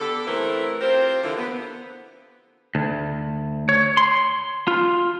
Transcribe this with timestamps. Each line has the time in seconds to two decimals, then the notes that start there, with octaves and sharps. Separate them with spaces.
0.01 D3 B3 G4 A4
0.27 E3 A3 C4 E4 A4 A#4
0.81 C4 F4 G4 A#4 C5
1.23 D3 E3 F3
1.37 B3
2.75 D2
3.69 C#5
3.97 C6
4.68 F4